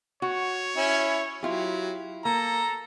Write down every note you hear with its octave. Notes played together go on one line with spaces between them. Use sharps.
F#4 C#5
C#4 E4
F#3 E4 F4 G4
A#3 A4 A#5